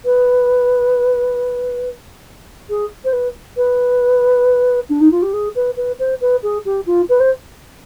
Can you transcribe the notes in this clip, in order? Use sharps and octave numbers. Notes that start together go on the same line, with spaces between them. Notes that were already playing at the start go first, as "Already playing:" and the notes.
B4
G#4
C5
B4
B4
D4
D#4
F4
G4
G#4
B4
B4
C5
B4
G#4
G4
F4
B4
C5